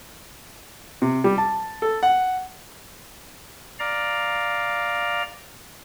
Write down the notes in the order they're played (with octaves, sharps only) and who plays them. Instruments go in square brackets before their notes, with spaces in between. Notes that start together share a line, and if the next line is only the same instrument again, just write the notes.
[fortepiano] C3
G3
A5
A4
F#5
[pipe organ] D5 F5 A#5